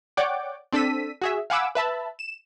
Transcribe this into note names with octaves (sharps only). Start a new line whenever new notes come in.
C#5 D5 F#5 G5 D6
C4 D4 A4 E6 B6 D#7
F#4 G#4 E5
F5 F#5 G#5 B5 D6 E6
B4 E5 A5 B5
E7